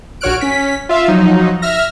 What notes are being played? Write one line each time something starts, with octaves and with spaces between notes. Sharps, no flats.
A#1 F#4 C#5 F6 F#6 D7
C#4 B6
F4 E5 F5
F3 F#3 D#4
E5 F6 A#6